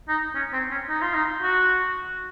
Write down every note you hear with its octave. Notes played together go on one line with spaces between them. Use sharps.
D#4
C#4
C4
C#4
D#4
F4
D#4
F#4